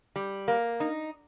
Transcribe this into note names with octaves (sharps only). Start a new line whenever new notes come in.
G3
A#3
D#4